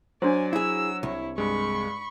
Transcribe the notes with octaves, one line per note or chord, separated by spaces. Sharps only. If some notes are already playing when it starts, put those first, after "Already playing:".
F#3 D4 F#4 C5 D5 G#5
E4 G#4 E6
C2 E4 C#5
G2 G#3 B5 C#6